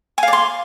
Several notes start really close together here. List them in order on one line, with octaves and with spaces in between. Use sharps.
G#5 F5 D5 C6